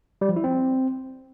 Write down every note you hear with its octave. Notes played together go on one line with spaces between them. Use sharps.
G3
F3
E4
C4